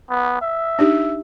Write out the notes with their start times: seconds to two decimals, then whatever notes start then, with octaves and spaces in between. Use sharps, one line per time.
0.10 B3
0.41 E5
0.79 D4 D#4 G4